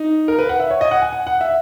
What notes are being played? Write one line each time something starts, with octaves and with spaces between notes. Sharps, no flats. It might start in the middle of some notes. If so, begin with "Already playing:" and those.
Already playing: D#4
A#4
B4
F#5
E5
C#5
D#5
F#5
G#5
F#5
F#5
E5